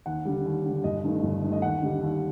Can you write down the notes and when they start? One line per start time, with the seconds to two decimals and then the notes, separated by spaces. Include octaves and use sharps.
0.06 D#2 F#5
0.25 D3 G3
0.45 D#2
0.65 D3 G3
0.84 G1 D#5
1.04 G2 D#3 A3
1.23 G1
1.43 G2 D#3 A3
1.52 D#5
1.62 D#2 F#5
1.82 D3 G3
2.02 D#2